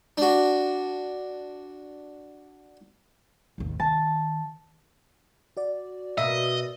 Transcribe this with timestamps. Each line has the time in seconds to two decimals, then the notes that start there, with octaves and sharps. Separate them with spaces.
0.18 D4 F#4
3.58 A1 D#2
3.80 D#3 A5
5.57 F#4 D5
6.18 B2 A#3 D#5 E5